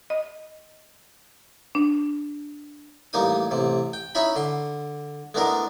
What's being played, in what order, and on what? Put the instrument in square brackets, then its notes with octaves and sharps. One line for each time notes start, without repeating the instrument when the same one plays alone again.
[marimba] D#5
D4
[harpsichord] A1 G3 A#3 D#4 D#6
A1 C3
G5
C#4 D#4 E4 E5 B5
D3 C6
G#3 A3 B3 D4 E4 A#4